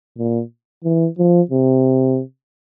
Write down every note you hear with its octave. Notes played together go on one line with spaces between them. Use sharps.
A#2
E3
F3
C3